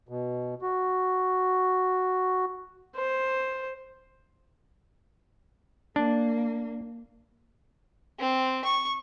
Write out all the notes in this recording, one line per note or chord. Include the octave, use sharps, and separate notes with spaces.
B2
F#4
C5
A#3 D4
C4
C#6